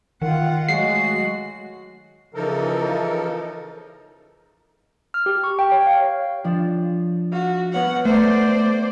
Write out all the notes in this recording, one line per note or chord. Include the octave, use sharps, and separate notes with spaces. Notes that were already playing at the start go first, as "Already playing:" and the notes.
D#3 F4 F#5
F#3 G#3 A3 F#4 F#5 C7
C#3 E3 F3 D#4 A4 A#4
F6
G4
C#6
G5
C#5
F5
F3 D4
F#4 F5
B3 C#5 F#5 F6
A3 C5 D5